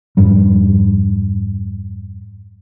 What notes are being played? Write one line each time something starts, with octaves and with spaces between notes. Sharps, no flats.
F2 G#2 G3